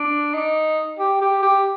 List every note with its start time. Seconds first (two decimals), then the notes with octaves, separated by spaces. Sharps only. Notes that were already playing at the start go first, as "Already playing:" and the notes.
Already playing: D4
0.34 D#4
0.99 G4
1.22 G4
1.43 G4